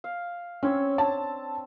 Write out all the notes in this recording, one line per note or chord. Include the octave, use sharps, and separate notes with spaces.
F5
C4 C#4 C#5 E6
D4 A5